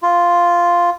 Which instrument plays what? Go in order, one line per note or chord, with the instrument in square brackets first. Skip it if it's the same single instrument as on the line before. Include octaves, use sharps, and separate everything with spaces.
[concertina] F4